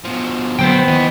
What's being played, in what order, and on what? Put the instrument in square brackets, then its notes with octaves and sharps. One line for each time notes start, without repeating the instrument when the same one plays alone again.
[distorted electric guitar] B2 F3
[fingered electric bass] D3 F#3 A#3 [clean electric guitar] B3 C5 G5
[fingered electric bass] D#3 [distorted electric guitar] E3 D#5